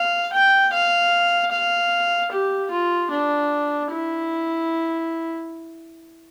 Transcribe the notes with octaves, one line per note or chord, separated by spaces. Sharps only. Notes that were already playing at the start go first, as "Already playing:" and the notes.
Already playing: F5
G5
F5
F5
G4
F4
D4
E4